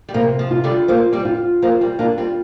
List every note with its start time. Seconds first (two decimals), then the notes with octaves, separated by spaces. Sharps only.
0.09 G3
0.14 C3 F3 A#3
0.39 F3
0.51 F4
0.64 D3 G3
0.88 F3 A#3 C5
1.13 G3 C4
1.25 F4
1.62 F3 A#3 C5
1.81 G3 C4
1.99 A#3 D4 F4
2.18 G3 C4